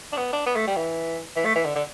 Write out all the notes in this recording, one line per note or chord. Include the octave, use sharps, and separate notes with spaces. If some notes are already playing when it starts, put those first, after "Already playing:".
D4
B3
D4
B3
A3
G3
E3
E3
A3
E3
D3
D3